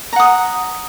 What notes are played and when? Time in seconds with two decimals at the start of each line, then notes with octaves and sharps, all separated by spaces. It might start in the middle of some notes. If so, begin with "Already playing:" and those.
0.13 A#5
0.16 F#5
0.20 D#6